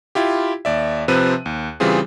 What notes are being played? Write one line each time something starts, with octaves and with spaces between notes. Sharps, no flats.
E4 F4 G4
D#2 D5 E5
C3 F3 C4 B4 F#6 D#7
D#2
C#3 E3 G3 C4 F4 G#4